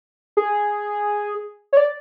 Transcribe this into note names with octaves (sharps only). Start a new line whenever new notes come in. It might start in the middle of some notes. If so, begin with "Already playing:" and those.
G#4
C#5
D5